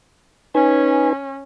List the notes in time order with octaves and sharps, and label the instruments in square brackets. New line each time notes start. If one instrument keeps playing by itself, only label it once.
[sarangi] C#4 [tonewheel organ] D#4 B4 G#5